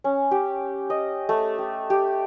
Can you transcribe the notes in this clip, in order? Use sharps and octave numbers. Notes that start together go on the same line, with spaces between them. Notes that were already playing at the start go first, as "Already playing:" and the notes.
C#4
G4
D#5
A3
G4
G4